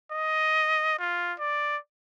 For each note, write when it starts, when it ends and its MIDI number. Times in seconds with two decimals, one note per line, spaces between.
0.12 0.95 75
0.99 1.33 65
1.39 1.77 74